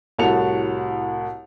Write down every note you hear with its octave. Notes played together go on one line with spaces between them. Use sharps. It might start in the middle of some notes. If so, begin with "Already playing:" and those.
C2 A2 F#4 A5 C#7 F7